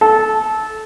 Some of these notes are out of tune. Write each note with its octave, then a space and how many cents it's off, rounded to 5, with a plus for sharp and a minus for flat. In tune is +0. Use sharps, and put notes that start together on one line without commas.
A4 -20